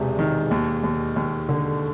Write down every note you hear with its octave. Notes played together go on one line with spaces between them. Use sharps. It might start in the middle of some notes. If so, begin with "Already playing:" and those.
Already playing: E1 E2 C3
D#3
D#2
D#2
D#2
D3